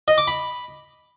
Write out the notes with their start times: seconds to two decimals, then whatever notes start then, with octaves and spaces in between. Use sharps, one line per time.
0.08 D#5
0.18 D6
0.28 B5